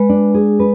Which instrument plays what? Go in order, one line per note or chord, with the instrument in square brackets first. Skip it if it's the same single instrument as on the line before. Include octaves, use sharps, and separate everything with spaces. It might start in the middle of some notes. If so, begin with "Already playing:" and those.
Already playing: [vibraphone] G#3 [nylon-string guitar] B4
[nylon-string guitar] D4
G#4
B4